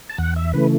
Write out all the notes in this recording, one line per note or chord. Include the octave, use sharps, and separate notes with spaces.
A5
E2 F#5
E5
C#3 E3 A3 B4